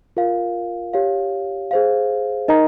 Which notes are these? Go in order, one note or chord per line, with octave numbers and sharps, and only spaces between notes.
F4 A#4 F5
G4 C#5 F5
G#4 C5 F5
D#4 A#4 D#5 A#5